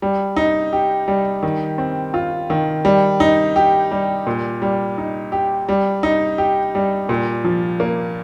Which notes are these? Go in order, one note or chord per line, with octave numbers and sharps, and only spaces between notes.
G3
D#4
G4
G3
D#3
C4
F4
D#3
G3
D#4
G4
G3
A#2
G3
D#4
G4
G3
D#4
G4
G3
A#2
F3
A#3